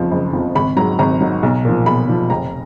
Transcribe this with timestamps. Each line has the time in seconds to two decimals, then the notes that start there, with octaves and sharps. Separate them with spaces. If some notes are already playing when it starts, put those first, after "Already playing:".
Already playing: F#1 F2 F3
0.11 F#1
0.33 F2 F3
0.55 G#1 B5
0.76 G#2 D#3 F#3 A#5
0.99 G#1 A#5
1.21 G#2 D#3 F#3
1.43 B1
1.65 A#2 F3
1.86 B1 B5
2.08 A#2 F3
2.30 F1 A#5